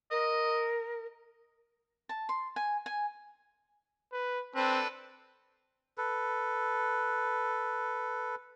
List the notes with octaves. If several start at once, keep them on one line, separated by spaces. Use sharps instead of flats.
A#4 D#5
A5
C6
G#5
G#5
B4
C4 D4 A4 B4
A4 B4